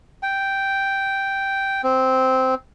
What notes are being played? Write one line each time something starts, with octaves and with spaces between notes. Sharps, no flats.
G5
C4